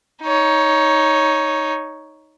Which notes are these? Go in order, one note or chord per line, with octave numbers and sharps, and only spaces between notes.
D#4 C#5